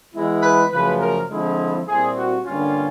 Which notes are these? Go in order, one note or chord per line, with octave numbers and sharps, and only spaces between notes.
E3 G#3 B3 E4
B4
F#2 C#3 F3 A3 B4
A#4
D3 F3 G#3 C4 E4
A#2 G3 C4 E4 G#4
F#4
G2 D3 G3 A#3 C#4 F4